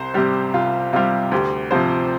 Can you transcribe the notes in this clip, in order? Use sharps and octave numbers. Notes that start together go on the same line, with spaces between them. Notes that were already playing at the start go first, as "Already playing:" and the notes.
Already playing: C2 C5
C3 G3 G4
C2 F4
C3 G3 F4
D2 G4
C3 F3 C5